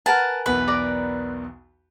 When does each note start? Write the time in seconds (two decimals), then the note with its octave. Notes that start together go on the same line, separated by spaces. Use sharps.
0.06 A#4 B4 F#5 G#5 A5 F6
0.46 B1 E2 B3 B4
0.67 A#4 D5 A#5